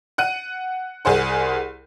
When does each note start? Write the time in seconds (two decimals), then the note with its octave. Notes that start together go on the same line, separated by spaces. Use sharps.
0.18 F#5 F#6 D#7
1.05 C2 G#4 C5 F#5